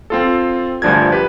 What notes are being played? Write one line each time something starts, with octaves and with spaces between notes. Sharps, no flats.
C4 F4 A4
D2 G2 F3 D4 A#4 G#6
G4 B4